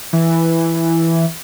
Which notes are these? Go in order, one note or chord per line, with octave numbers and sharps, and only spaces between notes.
E3